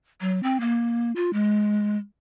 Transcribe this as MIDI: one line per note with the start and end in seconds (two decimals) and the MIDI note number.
0.21 0.42 54
0.43 0.60 60
0.60 1.12 58
1.16 1.33 65
1.33 1.97 56